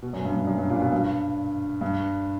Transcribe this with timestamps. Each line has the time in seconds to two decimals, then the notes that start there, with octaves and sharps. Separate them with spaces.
0.02 B2
0.13 F#2
0.25 G2
0.36 G2
0.47 F#2
0.58 G2
0.70 A#2
0.81 B2
0.92 G2
1.81 G2